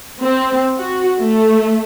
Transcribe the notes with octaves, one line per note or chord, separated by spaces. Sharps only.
C4
F#4
A3